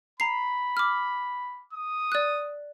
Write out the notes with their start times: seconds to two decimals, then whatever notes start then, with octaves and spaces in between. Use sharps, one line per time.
0.20 A#5 B5 C7
0.77 D6 F6
1.73 D#6
2.12 D5 F#6